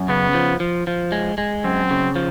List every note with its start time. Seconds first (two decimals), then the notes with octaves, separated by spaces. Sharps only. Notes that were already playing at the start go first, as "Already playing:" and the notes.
Already playing: F#2
0.08 C#3 B3
0.34 F3
0.60 F3
0.87 F3
1.12 G#3
1.38 G#3
1.64 F#2 C4
1.90 C#3
2.16 F3